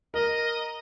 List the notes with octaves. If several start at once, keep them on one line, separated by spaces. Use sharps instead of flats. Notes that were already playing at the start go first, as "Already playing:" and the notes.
A#4 D#5